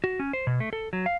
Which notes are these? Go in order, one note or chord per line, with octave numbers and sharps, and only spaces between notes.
F#4
C#4
C5
B2
A3
A4
F#3
F5